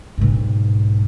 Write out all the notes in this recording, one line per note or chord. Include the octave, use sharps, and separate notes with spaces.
B1 G#2